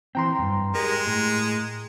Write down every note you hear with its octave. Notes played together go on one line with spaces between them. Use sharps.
E3 C4 G5 A#5 C6
E2 G2
G#3 G4 A#4
A2